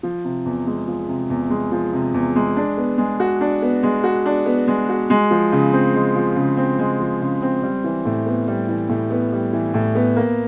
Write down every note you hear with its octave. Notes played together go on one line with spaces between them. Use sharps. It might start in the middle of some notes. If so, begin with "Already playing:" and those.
F3
C3
E2
G#3
F3
C3
E2
G#3
F3
C3
E2
G#3
D4
B3
G#3
F#4
D4
B3
G#3
F#4
D4
B3
G#3
F#4
G#3
F3
C#3
C4
G#3
F3
C#3
C4
G#3
F3
C#3
C4
G3
E3
A2
B3
G3
E3
A2
B3
G3
E3
A2
B3
A#3